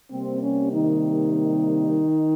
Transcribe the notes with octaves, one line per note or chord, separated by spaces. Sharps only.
C3 G3 A#3 C4
C#4
D#3 D#4